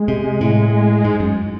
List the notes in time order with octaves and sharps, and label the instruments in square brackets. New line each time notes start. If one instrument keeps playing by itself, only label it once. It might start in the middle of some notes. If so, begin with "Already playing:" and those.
Already playing: [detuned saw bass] G#3
[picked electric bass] C3
A2
G#2
F#2